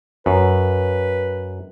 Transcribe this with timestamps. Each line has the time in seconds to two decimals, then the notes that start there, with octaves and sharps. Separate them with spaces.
0.26 F#2 B4